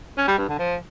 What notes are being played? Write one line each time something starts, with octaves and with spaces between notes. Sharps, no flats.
C#4
G3
G2
D3
F3